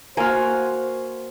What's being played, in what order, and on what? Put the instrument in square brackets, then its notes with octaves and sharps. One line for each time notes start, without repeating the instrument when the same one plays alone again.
[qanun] A#3 F#4 [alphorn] C5 [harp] G#5 C6 F6